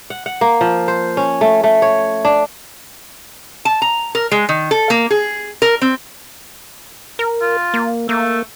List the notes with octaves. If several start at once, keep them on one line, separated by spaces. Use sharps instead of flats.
F#5
F#5
A#3
F3
C5
C#4
A3
A3
C#5
D4
A5
A#5
A#4
G#3
D#3
A4
A#3
G#4
A#4
C4
A#4
F4
A#3
A3 A#3